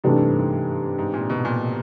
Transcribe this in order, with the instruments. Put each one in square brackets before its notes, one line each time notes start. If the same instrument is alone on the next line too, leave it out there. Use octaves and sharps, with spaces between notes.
[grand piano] G#2 [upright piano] C3 E3 A3 D4
[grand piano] G2
G2
G#2
G#2
A#2
B2
A#2